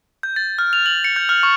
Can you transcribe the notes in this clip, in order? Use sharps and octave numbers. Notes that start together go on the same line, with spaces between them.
G6
A6
F6
F7
F#7
C#7
G6
F6
C#6